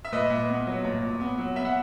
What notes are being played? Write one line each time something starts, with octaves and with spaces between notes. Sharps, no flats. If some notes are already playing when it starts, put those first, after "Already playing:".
E5
A#2 B4 D#5
A#2
B3
F#3
A#2
A#2
B3
F#3
B3 E5
F#5